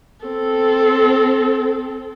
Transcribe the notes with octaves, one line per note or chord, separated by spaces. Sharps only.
C4 A4